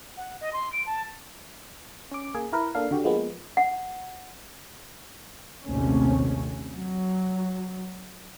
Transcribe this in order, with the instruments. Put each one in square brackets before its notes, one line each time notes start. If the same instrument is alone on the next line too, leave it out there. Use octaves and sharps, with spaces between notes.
[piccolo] F#5
D#5
C6
D7
A5
[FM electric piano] C#4 D6
A#3 G#4
E4 A#4 B4
A#3 D4 A4 F5
D3 F#4 G4
F3 G#3 A#3 B3
[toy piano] F#5
[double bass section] A#1 D#2 C3 A3 C#4
F#3